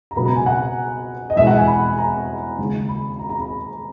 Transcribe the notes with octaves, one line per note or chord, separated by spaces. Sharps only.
A#5
C#2 B2 F#3 B3 B5
A#5
G#5
F#5
D#5
E2 B2 G#3 E5
F#5
G#5
B5
A#5
D#2 C#3 G#3
B5
A#5
A#5
B5